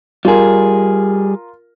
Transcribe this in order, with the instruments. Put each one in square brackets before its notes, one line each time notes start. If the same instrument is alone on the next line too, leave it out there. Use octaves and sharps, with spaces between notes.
[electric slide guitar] G3 G#4 [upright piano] F4 A#4